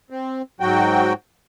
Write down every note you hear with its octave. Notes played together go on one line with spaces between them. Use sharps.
C4
G#2 F#3 F#4 G5